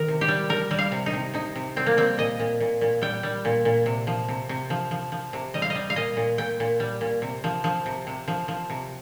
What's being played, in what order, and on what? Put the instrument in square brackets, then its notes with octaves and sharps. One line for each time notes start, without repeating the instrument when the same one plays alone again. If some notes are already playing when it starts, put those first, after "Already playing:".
Already playing: [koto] D#3 A#4
C3
G4
G3
G3 A#4
G3
F5
C3
D#4
C3
C3 D#4
C3
G3 C4
A#3
G3 C4
A#2 D#5
A#2
A#2
A#2
G3 G5
G3
A#2
A#2
C3
F3
C3
C3
F3
F3
F3
C3
G3 D#5
F5
D#5
G3
F5
A#2 D#5
A#2
A#2 G5
A#2
G3
A#2
C3
F3
F3
C3
C3
F3
F3
C3